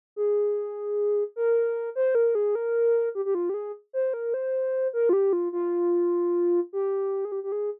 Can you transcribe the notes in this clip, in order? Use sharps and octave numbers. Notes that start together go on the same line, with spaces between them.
G#4
A#4
C5
A#4
G#4
A#4
G4
G4
F4
G4
G#4
C5
A#4
C5
A#4
F4
G4
F4
F4
G4
G#4
G4
G4
G#4